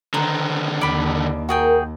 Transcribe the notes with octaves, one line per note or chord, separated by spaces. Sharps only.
D3 D#3 B4 C5 A#5
D#2 D5 B5
F#4 G#4 A#4 G5